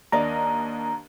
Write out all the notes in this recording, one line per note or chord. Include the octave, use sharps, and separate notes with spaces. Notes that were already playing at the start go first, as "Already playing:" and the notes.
D#2 D4 A#4 D5 D#5 A#5